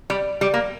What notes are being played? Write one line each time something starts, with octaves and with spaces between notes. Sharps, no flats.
G3
G3
A#3